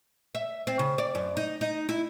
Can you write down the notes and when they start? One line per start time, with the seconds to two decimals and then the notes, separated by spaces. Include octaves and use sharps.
0.35 E5
0.67 C4
0.79 C#3
0.98 D5
1.15 F#2
1.37 D#4
1.61 D#4
1.89 E4